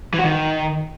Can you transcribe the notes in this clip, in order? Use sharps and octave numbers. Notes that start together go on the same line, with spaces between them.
E3
F#4
D#3